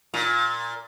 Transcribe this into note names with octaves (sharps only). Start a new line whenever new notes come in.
A#2